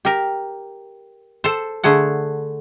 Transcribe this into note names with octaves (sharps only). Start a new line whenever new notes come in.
G4 A#4
A4 C5
D3 A3 G#4 F#5